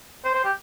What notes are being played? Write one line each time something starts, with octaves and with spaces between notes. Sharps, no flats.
C5
C5
G4